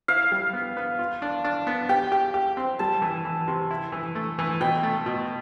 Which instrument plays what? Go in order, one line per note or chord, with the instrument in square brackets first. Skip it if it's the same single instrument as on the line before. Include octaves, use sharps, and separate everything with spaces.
[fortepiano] E4 [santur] F5
[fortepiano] G3
B3
B3
F4
D4
D4
B3
[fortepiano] G4 [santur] G5
[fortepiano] G4
G4
C4
[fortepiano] G3 [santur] A5
[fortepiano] E3
E3
C3
E4
E3
A3
E3
[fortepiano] B2 [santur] G5
[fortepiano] A3
B2